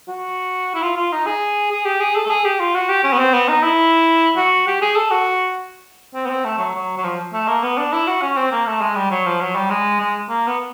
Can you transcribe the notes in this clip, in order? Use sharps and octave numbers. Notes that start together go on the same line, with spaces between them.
F#4
E4
F4
F4
D#4
G#4
G#4
G4
G#4
A4
A4
G#4
G4
F4
F#4
G4
C#4
B3
C4
B3
D#4
E4
F#4
G4
G#4
A4
F#4
C4
B3
C4
A3
F#3
F#3
F#3
F3
A3
A#3
B3
D4
E4
F#4
C#4
C4
A#3
A3
G#3
G3
F#3
F3
F#3
G3
G#3
G#3
A#3
B3